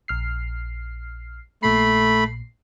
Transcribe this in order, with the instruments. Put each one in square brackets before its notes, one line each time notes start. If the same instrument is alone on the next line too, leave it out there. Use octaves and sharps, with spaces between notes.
[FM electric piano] A#1 F6 C7
[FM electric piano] A#1 A#2 C7 [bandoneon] A3 B5